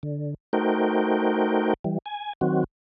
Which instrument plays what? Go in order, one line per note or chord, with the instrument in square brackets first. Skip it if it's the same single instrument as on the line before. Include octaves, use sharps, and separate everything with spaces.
[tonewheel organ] D3
A3 D#4 F#4 A#4 C5 G5
E3 G3
G#5
D#3 F#3 C4 F#4